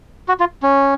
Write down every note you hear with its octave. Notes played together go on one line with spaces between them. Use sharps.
F#4
F4
C#4